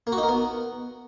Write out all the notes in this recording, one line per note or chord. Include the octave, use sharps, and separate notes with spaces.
A#3
F#4
D#4
A#4
B3